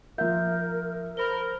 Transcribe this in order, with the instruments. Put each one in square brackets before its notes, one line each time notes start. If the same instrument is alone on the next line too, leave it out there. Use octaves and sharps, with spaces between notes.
[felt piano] F3 E5 [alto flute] A#4 [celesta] G6
[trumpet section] A#4 [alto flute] C5 [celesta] B5 G7